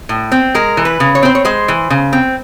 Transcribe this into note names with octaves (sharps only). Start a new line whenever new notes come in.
A2
C4
G#3 A#4
E3
B4
C#3
C#5
C4 C5
C#5
G#3 C5
E3
C#3
C4